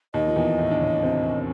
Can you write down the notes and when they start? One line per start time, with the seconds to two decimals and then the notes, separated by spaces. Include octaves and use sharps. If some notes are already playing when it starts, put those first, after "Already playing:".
0.14 D#2 D#3 D#5
0.27 F3
0.36 E2 E3
0.58 A2 A3
0.71 D4
0.80 C#3 C#4
1.03 C3 C4